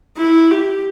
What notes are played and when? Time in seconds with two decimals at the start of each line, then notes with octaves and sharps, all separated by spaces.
0.17 E4
0.51 G4